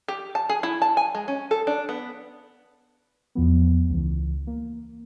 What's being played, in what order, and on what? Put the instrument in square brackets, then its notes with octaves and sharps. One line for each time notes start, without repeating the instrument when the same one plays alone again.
[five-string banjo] G4
A5
G#4
E4
A5
G#5
G#3
C#4
A4
D4
B3
[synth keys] E2 F3 B3
C#2 E3
A#3